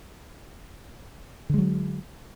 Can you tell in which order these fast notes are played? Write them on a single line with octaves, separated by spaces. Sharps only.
D3 G#3 F#3